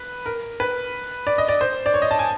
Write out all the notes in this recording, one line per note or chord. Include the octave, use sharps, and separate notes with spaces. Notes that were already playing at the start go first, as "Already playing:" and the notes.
Already playing: B4
A#4
B4
D5
D#5
D5
C5
D5
C#5
D#5
A5
G#5